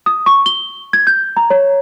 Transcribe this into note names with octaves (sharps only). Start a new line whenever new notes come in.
D#6
C#6
G7
G#6
G6
A#5
C#5